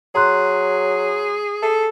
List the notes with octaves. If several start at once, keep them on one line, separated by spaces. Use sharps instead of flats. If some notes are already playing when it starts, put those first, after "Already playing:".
F#3 G#4 A#5 C6 F#6
A4